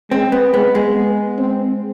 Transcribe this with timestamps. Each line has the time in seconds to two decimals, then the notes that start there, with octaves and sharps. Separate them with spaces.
0.11 G#3 C4
0.32 B3
0.53 G#3 B3
0.75 G#3
0.96 B3
1.38 C4